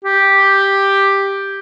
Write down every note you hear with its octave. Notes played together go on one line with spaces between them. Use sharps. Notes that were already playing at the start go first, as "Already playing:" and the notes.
G4